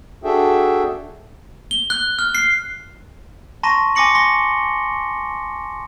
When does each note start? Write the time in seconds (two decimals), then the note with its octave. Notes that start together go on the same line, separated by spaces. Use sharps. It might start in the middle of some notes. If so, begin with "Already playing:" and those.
0.24 D4 F#4 G#4 A4 E5 G5
1.71 G7
1.90 F#6
2.19 F6
2.35 C7
3.63 A5 A#5 C6 C#6 A#6 D#7
3.95 G#5 C6 D6 A#6 C#7 F#7
4.15 C6 A#6 G7